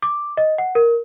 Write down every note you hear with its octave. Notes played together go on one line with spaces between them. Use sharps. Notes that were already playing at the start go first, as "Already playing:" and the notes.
D6
D#5
F#5
A#4